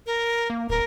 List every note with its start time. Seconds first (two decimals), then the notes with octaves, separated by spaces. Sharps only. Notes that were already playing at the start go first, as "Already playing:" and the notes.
0.06 A#4
0.50 A#3
0.69 D1 A#4